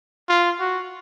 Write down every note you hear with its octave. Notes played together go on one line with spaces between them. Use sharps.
F4
F#4